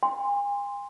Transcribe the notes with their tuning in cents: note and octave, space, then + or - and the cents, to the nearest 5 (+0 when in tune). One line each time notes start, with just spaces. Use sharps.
G#5 -40 C6 +0